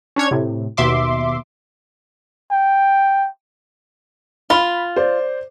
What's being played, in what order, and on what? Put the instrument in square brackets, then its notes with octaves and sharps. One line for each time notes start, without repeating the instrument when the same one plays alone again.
[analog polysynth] C#4 D4 C#5 G#6
A2 C3
D#2 B2 E5 C6 D6
[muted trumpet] G5
[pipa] F4 [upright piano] B5
[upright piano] C5 D5